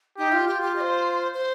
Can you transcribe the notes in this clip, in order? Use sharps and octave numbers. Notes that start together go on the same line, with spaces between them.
D#4 G4
F4
F4 G4
G4
D#5
C5
C5